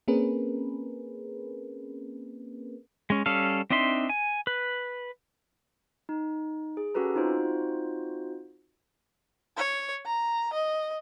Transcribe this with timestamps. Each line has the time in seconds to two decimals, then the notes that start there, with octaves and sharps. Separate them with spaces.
0.08 A#3 C4 C#4 G#4 A#4 B4
3.10 G#3 C#4
3.26 G3 C#4 A4 F5
3.70 C4 D4 D#4 E5 C6
4.10 G#5
4.47 B4
6.09 D#4
6.77 G#4
6.94 C#4 F#4 G4 A4 B4 A#5
7.15 C4 D#4 F4 F#4 C5
9.57 C#5
10.06 A#5
10.54 D#5